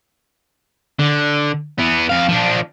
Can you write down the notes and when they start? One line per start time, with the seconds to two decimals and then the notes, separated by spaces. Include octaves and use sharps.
0.99 D3
1.79 E3 B3
2.10 F2 F5
2.29 F3 D4